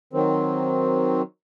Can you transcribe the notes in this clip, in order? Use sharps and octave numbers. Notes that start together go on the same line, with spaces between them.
D#3 F#3 C4